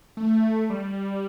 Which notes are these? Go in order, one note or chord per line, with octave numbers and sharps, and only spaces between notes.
A3
G3